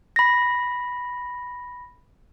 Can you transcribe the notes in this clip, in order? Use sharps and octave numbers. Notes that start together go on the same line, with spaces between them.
B5 A#6